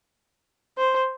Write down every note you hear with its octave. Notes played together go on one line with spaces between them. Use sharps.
C5